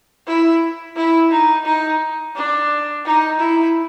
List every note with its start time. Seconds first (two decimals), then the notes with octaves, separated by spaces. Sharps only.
0.27 E4
0.96 E4
1.31 D#4
1.65 D#4
2.36 D4
3.05 D#4
3.39 E4